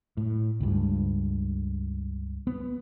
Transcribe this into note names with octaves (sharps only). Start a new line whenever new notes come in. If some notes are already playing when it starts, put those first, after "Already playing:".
A2
C#2 G2
B3